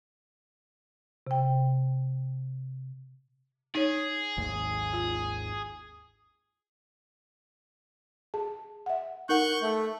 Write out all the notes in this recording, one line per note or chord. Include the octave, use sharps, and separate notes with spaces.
C3 G5
D#4 G#4 C#5
G#1 D#2
F4
G#4 A5
E5 F#5
D#4 A#4 F#5 C#6 F#6 G6
A3